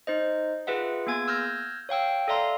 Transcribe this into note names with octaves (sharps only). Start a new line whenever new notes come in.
D#4 C5 D#5
F4 G#4 B4 E5 F#5
A#3 B3 G#4 G#5 G#6
E6 F6 G6 G#6 A#6
C#5 F5 G5 E6
A4 D5 E5 F5 A#5 C6